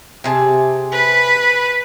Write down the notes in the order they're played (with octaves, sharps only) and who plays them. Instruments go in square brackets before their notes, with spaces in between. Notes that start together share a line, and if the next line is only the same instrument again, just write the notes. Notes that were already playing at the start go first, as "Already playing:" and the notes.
[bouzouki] C3 G#4 A5
[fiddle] B4 B5